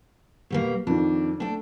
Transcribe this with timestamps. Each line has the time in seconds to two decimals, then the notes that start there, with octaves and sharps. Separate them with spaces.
0.50 B2 G3 A#3
0.87 F2 D#3 D4
1.40 A3 D4 G5